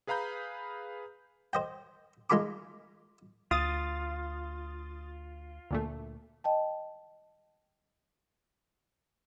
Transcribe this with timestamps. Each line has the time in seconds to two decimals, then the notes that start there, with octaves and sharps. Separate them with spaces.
0.07 G#4 B4 F5 A#5 B5 G6
1.53 C5 D#5 G5
2.30 G#3 D#4 F4 G#4 B5 D6
3.51 D2 F4 D#6 A6
5.71 D2 A#2 A3
6.44 D#5 G5 A5